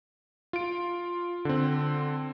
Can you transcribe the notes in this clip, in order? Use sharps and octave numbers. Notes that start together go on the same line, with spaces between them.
F4 D7
D3 C4